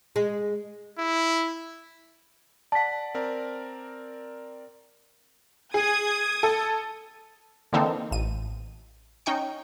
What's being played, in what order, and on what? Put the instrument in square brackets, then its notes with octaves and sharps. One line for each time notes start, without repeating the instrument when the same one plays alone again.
[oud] G#3
[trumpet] E4
[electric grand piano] D5 F#5 [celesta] A5 B6
[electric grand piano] C4 A#4 D5
[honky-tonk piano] G#4 [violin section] D#6 G#6
[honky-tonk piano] A4
[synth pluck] D3 E3 A#3 C4 D#4 A4
A1 D#7
C#4 D#4 G5 C#6